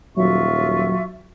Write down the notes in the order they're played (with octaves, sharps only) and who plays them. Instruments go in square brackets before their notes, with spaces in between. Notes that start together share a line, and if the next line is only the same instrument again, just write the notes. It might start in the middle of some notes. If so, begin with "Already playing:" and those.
[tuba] D#1 [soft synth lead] F#3 [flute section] F4 E5 C#6